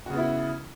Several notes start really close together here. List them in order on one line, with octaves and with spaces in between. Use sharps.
F#4 C#3 B3 E4